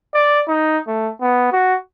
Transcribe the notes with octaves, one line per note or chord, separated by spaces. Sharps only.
D5
D#4
A3
B3
F#4